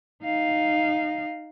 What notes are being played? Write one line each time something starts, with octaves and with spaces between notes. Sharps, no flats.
D#4 F5